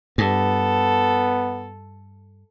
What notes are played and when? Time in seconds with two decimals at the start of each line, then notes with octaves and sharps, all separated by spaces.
0.18 G2 B3 A4